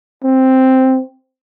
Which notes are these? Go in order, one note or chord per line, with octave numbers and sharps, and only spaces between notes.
C4